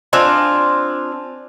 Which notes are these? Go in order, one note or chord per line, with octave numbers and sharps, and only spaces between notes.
C4 D4 F4 G#5